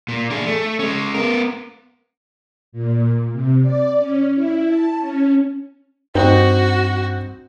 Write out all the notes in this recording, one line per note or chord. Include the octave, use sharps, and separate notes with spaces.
A#2
D4 G#4
A3
G#3 C#4
B3 A#4
A#2
C3
D5
C#4
E4
A5
C#4
G2 C4 D#4 F#4